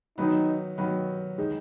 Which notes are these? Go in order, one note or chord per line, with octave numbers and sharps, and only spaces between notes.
D#3 F#3 B3 D#4
D#3 F#3 B3
D#3 G#3 D#4